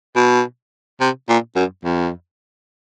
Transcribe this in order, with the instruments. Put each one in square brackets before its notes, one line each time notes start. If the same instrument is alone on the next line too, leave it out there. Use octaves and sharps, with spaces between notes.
[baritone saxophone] B2
C3
A#2
F#2
F2